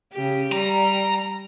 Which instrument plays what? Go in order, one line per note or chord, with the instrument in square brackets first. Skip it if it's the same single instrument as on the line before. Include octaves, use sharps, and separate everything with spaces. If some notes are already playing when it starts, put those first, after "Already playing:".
[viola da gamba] C#3 G4
[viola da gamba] G3 [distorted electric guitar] A#5